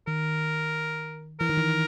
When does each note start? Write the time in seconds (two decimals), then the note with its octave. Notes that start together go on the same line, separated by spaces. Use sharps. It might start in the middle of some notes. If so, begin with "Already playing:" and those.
0.07 D#3 A#4
1.40 E3 A#4
1.49 D#3
1.57 E3